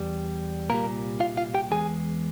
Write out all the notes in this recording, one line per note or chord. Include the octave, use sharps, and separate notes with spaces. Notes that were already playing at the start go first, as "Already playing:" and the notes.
Already playing: E2 G3
C2 A#2 G3 A#3 A#4
F4 F5
F4 F5
G4 G5
E2 E3 G#3 G#4 G#5